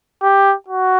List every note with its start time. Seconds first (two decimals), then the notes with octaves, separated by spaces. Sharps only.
0.22 G4
0.68 F#4